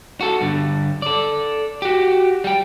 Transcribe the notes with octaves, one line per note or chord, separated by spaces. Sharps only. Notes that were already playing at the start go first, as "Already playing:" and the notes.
F#4 A4
G2 D3
A4 D5
F#4 G4
G3 G5